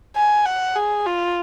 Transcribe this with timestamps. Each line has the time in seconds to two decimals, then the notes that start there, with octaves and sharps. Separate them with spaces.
0.16 G#5
0.46 F#5
0.76 G#4
1.06 F4